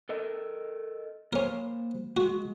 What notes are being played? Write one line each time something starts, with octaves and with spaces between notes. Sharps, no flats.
A4 A#4 D#5
A#3 C#4 A#4 C5
G#3 F#4